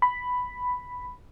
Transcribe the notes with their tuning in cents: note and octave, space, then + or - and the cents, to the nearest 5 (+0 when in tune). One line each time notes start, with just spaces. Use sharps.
B5 +5